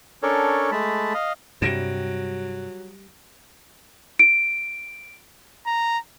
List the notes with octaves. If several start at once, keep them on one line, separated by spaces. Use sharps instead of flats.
C#4 D4 A4 A#4 C#5
G#3 A3 A5 B5
D#5 F5
G2 C3 F#3 G3 A#6 D7 E7
D7
A#5